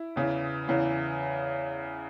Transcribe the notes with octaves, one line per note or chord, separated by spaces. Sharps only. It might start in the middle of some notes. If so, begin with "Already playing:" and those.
Already playing: E4
E2 C#3 E3
E2 C#3 E3